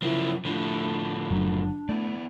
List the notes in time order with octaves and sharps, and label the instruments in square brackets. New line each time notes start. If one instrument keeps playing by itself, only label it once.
[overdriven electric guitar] C#3 F3 [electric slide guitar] F#3 A#4 C5 [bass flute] E4
[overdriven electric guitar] A2 F3 [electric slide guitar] D3 [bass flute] A3
[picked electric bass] F#1 F#3 [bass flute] D4
[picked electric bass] A3 [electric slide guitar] B3 E4 D5